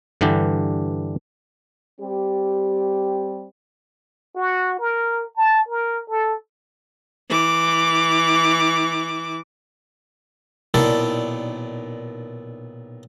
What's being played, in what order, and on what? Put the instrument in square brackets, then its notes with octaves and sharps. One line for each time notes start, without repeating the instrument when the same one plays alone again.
[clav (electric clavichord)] G2 D3 E3 D4 G4
[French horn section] G3 C4 G4
[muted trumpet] F#4
A#4
A5
A#4
A4
[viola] E3 D6
[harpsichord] B1 A#2 D#3 E4 A4 D5